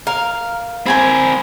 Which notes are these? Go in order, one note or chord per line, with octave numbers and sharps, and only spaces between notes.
A#4 F5
C4 A#4 C5 G#5 B5